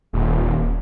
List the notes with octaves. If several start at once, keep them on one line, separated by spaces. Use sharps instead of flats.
D#1